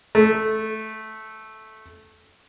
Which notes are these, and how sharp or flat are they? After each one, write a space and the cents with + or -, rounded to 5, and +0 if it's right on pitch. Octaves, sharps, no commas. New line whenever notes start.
A3 -10